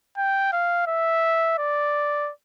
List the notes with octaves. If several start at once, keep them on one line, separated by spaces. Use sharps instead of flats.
G5
F5
E5
D5